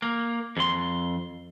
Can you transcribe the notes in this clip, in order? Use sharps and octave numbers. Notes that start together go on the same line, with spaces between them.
A#3
F2 C6